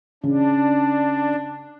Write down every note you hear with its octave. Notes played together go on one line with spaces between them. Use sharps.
C#3 D4